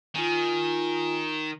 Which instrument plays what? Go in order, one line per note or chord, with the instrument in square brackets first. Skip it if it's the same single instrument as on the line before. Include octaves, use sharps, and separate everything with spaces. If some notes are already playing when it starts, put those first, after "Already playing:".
[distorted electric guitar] D#3 [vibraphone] F4 G#5